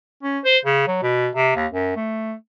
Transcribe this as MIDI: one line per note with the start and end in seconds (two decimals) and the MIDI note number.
0.23 0.39 61
0.45 0.58 72
0.65 0.85 49
0.88 0.99 54
1.02 1.29 47
1.36 1.53 48
1.56 1.67 39
1.72 1.93 42
1.96 2.34 57